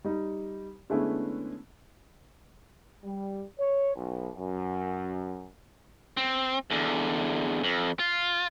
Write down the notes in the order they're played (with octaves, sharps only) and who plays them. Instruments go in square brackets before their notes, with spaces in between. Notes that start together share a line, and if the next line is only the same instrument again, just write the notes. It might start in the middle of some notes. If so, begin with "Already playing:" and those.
[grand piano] G3 D#4
D3 G#3 A3 B3 C#4 E4
[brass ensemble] G3
C#5
B1
F#2
[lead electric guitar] C4
E2 D3
F2
F4